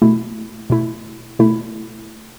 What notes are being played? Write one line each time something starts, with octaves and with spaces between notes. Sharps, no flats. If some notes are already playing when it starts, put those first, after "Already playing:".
B2 A3 E4
B2 A3 E4
B2 A3 E4